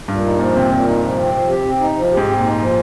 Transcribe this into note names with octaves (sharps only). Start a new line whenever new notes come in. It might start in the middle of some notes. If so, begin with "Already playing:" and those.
G2 A#2
D#4
A#2 F3
C3 C4
A#2
D#4
F3
C4
F3
G4
C4
D#4
F3
G#2 G4
C4
A#2
D#4
F3